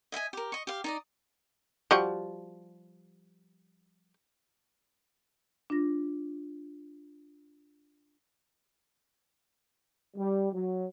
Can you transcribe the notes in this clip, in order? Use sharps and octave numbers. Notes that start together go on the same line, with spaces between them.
D#5 E5 G5 G#5
G4 A#4
D#5 C#6
G4 F5
D#4 D5 D#5
F3 G3 F#4
D4 F4 A#6
G3
F#3